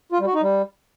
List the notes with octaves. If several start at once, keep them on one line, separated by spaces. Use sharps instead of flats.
F4
G3
F#4
D#4
G3